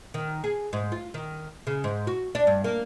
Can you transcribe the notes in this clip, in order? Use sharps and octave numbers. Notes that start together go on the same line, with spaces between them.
D#3
G#4
G#2
F4
D#3
C#3
G#2
F#4
D4
G2
A#3